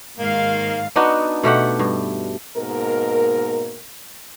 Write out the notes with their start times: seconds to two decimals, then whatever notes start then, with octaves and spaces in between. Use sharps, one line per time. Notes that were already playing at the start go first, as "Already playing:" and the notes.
0.17 G#2 D#3 A#3 F5
0.96 B3 D4 D#4 F#4
1.43 B2 A3 G4 F#5
1.79 G2
2.57 G#2 B2 A#3 A#4